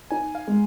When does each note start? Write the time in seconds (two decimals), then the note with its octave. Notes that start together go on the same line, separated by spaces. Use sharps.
0.11 D#4 G#5
0.35 F5
0.47 G#3